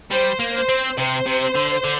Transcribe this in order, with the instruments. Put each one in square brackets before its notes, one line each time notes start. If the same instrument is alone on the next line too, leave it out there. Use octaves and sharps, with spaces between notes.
[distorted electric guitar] G3 [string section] C5
[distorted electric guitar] A#3
[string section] C5
[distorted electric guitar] C4
[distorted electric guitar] C3 [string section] C5
[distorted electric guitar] C3
D3
D3